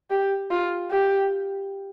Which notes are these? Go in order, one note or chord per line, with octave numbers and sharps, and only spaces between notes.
G4
F4
G4